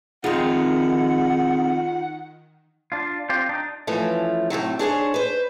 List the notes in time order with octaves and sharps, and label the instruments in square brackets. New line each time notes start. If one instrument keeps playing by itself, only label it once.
[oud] F2 G#3 [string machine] D#3 [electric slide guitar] D#4 F4 [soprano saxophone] F#5
[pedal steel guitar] D4 F4
C4 F4 G4
D4 D#4
[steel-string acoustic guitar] E3 F3 A3 C#4
A2 C3 D#3 F#3
D4 G#4 C5 C#5
B4 C5